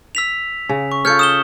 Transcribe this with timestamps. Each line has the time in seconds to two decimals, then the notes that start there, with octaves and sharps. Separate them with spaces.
0.15 E6 B6 F7
0.69 C#3
0.92 C#6
1.05 F4 A4 C#5 F6 G6 C#7
1.19 D#6 E7 G7